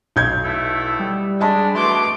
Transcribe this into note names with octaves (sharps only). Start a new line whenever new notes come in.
B1 G6 G#6
A3 B3 E4
G3
G#3 D4 D#5 A5 B5
B2 E3 A3 C6 D6